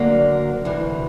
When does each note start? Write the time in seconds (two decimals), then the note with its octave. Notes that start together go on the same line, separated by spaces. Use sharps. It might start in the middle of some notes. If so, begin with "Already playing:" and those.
Already playing: D2 D3 F#3 A#3
0.65 D2 C3 E3